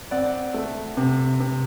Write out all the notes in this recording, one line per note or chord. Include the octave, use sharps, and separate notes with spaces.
C4 D5 F#5
A3
C3
C3